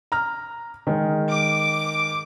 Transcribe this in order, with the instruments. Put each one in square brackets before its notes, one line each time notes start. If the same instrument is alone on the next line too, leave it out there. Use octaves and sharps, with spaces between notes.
[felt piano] A#5 F6
D#3 G#3
[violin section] D6